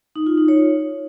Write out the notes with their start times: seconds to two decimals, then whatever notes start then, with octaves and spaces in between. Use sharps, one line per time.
0.16 D#4
0.26 F4
0.37 D#4
0.48 C#5